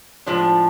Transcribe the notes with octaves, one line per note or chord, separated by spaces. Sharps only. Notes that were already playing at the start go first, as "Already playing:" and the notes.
A2 F3 G#3 D4